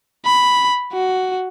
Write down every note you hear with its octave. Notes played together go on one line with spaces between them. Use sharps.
B5
F#4